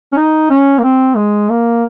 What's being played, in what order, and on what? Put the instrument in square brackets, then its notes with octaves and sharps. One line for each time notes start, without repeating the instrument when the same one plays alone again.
[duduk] C#4
D#4
C#4
A#3
C4
G#3
A#3